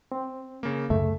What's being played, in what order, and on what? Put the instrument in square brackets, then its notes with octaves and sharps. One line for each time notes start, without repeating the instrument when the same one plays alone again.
[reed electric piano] C4
[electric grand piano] C#3 A#3
[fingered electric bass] C2 F#2 C#3 [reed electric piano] A3 [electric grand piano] E5